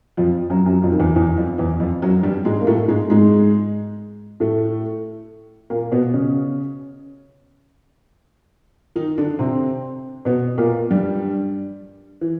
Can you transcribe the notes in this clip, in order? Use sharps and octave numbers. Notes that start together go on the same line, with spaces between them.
F2 F3
F#2 F#3
F#2 F#3
F2 F3
D#3
E2 E3
E2 E3
F2 F3
E2 E3
F2 F3
F#2 F#3
G2 G3
G#2 G#3
A#3
A2 A3
G#2 G#3
G#2 G#3
A2 A3
A#2 A#3
B2 B3
C#3 C#4
D#3 D#4
D3 D4
C3 C4
B2 B3
A#2 A#3
G2 G3
E3